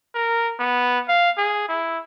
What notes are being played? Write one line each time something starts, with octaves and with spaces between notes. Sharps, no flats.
A#4
B3
F5
G#4
E4